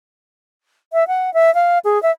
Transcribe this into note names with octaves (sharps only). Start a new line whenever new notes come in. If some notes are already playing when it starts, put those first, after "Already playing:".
E5
F#5
E5
F5
G#4
E5